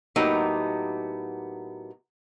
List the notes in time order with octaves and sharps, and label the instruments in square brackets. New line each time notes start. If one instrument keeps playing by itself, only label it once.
[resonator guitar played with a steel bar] A2 F#3 A#3 B3 D#4 G4